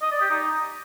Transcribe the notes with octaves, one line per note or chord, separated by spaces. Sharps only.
D#5
D5
G4
D#4